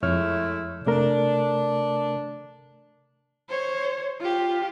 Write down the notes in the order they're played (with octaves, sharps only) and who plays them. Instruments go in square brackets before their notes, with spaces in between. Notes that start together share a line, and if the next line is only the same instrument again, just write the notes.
[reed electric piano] F2 C#5 F6 [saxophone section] G#3 A3 E4
[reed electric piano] C3 A3 A#4 [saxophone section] D4
[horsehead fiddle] C5 C#5
F4 G4